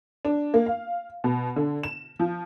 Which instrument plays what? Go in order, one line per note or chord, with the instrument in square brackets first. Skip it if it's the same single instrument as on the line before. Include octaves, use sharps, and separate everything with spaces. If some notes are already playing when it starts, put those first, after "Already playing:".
[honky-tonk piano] D4
A#3
F5
B2
D3
E7
F3